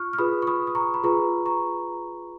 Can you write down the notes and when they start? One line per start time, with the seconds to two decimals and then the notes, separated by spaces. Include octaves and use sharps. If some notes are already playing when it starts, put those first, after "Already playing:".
Already playing: F4 C#6 F6 F#6
0.13 F6
0.18 F4 G#4 B4 B5 D#6
0.42 C#6
0.47 B5 D#6
0.67 D#6
0.75 A#5 C#6
0.94 B5
1.04 F4 G#4 B4 A#5 C#6
1.46 A#5 C#6